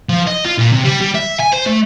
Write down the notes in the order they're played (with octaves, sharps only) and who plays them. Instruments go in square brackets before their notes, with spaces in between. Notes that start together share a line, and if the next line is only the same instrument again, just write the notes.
[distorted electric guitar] F3
D#5
F4
A#2
C3
G3
G3
E5
G#5
C5
A3